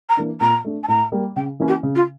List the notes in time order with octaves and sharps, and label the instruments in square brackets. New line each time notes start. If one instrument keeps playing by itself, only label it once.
[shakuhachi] A#5
[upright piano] E3 A#3 D4
[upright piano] A#2 [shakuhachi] A#5
[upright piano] A3 D4
[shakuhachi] A5
[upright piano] A2 [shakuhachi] A#5
[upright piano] G3 A#3
[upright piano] C#3 [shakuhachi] G5
[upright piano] E3 A#3 C#4 E4
[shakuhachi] G4
[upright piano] C#3
[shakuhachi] F4